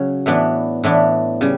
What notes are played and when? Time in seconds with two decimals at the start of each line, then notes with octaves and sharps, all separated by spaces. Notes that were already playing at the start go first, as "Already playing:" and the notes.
Already playing: C#3 F#3 C#4
0.26 A2 E3 B3 D4
0.84 A2 E3 B3 D4
1.41 C#3 G3